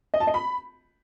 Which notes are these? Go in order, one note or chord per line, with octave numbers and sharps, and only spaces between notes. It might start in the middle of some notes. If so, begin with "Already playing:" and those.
D#5
A5
D#5
B5